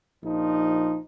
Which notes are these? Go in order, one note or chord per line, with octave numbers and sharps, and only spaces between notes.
A#1 F3 D#4